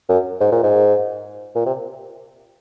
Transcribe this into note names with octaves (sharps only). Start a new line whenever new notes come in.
F#2
G#2
A#2
G#2
A#2
C3